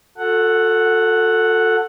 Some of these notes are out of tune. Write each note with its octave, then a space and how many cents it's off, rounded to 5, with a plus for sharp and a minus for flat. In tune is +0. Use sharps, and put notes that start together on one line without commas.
F#4 -45 A4 +15 F#5 +0